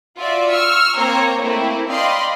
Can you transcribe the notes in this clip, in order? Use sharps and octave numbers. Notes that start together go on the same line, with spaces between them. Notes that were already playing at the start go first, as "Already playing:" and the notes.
F4 F#4 D5 E5
C#6 E6 F6
A#3 C4 C5 C#5 A#5
A3 A#3 C4 E4
D5 D#5 F5 G5 B5 C6